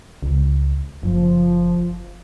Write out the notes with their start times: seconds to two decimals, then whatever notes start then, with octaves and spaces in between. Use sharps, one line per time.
0.23 C#2
1.03 F#1 F3